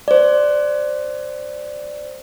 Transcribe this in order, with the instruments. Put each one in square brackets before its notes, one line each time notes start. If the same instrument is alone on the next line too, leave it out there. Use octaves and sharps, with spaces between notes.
[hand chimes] C5 D5